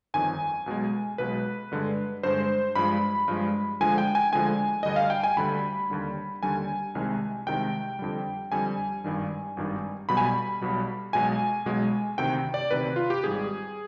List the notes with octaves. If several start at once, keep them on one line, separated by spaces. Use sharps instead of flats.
G1 F2 D#3 G#5
B1 B2 G#3
B1 B2 G#3 B4
G2 D3 G#3
G2 D3 G#3 C5
G2 F3 G#3 B5
G2 F3 G#3
D2 D3 F3 G#3 G#5
G5
G#5
D2 D3 F3 G#3 G#5
D2 D3 G3 D#5
F5
G5
G#5
D2 D3 G3 B5
D#2 D3 G3
D#2 D3 G3 G#5
C2 C3 D#3 G#3
C2 C3 D#3 G#3 G5
F2 D3 G3
F2 D3 G3 G#5
G#1 G2 D#3 G3
G#1 G2 D#3 G3
B1 B2 G3 B5
G#5
B5
B1 B2 G3
B1 B2 G#3 G#5
B1 B2 G#3
D2 C3 D#3 G5
D5
D2 C3 D#3 B4
F4
G4
G#1 G#2 G3 G#4